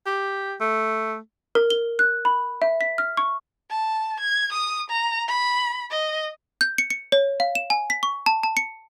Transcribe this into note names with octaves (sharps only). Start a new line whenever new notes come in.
G4
A3
A#4
G7
F#6
B5
E5
B6
F6
C#6
A5
G#6
D#6
A#5
B5
D#5
G6
C#7
C#7
C#5
F5
E7
G#5
B6
C#6
A5
A5
C#7